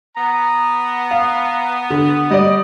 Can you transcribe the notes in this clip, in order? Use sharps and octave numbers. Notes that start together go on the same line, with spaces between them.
B3 A#5
F5
D3
G3 D5 D#5